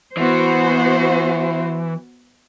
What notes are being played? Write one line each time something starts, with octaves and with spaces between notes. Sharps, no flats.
E3 B3 F#4 C5